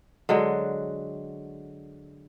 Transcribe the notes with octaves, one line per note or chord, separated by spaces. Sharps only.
D3 F#3 G#3